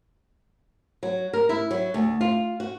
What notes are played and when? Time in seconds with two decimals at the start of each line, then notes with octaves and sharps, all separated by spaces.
1.03 F#3
1.33 A#4
1.49 E4
1.71 F#3
1.94 D2
2.21 F4
2.60 F#4